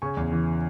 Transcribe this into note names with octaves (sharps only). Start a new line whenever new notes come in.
C#3 G#5 C#6
E2
E3